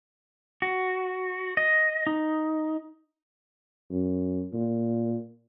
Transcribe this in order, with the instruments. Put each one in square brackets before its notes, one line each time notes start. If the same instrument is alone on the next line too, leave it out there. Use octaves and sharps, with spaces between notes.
[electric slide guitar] F#4
D#5
D#4
[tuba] F#2
A#2